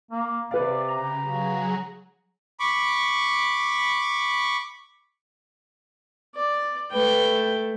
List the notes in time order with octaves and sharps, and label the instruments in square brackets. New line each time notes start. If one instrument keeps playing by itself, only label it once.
[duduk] A#3
[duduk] C3 [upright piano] B4 F5 [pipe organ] D5
[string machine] C#3 G4 [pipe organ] A#5
[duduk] C#3 [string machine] F#3 F#4 G#4
[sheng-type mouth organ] B5 C#6 D6
[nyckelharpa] D5
[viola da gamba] A3 [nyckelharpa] B4 G5